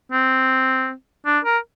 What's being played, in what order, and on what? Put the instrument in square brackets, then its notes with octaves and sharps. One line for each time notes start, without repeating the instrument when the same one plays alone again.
[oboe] C4
D4
A#4